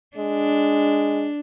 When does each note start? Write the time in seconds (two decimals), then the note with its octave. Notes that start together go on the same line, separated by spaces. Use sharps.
0.17 G#3 D4